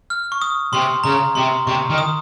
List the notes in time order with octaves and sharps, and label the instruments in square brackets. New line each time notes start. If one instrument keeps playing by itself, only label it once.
[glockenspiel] F6
C#6
D#6
[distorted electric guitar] C3 [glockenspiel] C6
[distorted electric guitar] C#3 [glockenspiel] A#5
[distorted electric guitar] C3 [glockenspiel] C6
[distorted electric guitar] C3 [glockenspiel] C#6
[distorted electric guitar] D#3
[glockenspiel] D#6